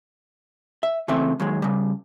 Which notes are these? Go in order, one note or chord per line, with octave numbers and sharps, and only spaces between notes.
E5
C#3 E3 A3 C4 E5
D#2 F#3 G#3
C#3 G3